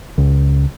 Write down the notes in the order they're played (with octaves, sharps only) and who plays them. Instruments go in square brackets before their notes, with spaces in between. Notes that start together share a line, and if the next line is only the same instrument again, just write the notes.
[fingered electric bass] C#2